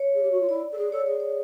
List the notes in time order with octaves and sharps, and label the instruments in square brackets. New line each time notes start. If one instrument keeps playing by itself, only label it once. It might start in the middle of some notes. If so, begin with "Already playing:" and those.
Already playing: [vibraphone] C#5
[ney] G#4
G4
F#4
F4
[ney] E4 [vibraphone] D5
[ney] A4
[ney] G#4 [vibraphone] D5
[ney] A4 [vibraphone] C#5
[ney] G#4 [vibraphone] D5
[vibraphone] C#5